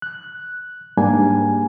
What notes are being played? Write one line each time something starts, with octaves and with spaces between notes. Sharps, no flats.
F#6
G#2 G3 A#3 D4 G#5